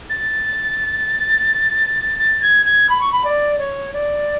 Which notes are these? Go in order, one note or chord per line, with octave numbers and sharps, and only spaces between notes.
A6
A6
G#6
G#6
B5
C#6
B5
D5
C#5
D5